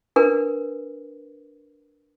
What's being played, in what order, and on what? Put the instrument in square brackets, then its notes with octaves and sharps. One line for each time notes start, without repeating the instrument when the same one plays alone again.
[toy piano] D4 A#4 B4